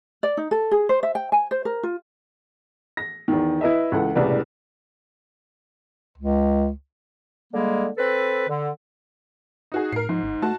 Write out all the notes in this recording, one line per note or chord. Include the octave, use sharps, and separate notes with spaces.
D5
D#4
A4
G#4
C5
E5
G5
G#5
C5
A#4
F4
A#6
E2 D#3
E4 B4 D#5 E5
C#2 E3 A4 F#5
E1 C2 A2 C#3 B4 D5
C#2
D3 G3 G#3 A#3 G#4
C4 A4 B4
D3
D#4 F#4 G#4
A2 A#4 C7
G#2 F3
G1
A3 F#4 A5